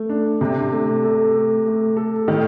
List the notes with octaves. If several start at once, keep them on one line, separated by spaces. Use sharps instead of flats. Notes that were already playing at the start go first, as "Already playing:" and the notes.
Already playing: A3
D4
C3 D4
A3
A4
A3
A3
A4
A2 D#3